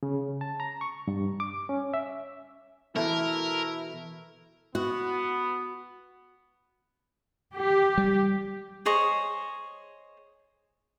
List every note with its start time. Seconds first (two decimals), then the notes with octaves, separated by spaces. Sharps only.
0.03 C#3
0.41 A5
0.60 A#5
0.81 C#6
1.08 G2
1.40 D6
1.69 C#4
1.94 E5
2.96 B2 E3 A3 E4 A#4
4.75 B3 F#4
7.56 G4
7.98 G3
8.85 G#4 C5 C#5 D#5